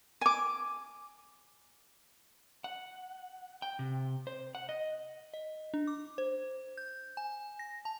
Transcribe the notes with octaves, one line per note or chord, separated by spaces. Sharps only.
G#5 D6
F#5
G5
C3
C5
F#5
D#5
D#5
D4
D6
C5
G6
G#5
A#6
A5